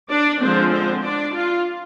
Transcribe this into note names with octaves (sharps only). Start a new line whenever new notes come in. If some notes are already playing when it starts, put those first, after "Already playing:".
D4 D5
D3 F3 G#3 C4 C5
C4 C5
D4 D5
F4